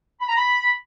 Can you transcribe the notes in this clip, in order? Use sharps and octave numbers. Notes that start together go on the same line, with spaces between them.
B5
A#5
B5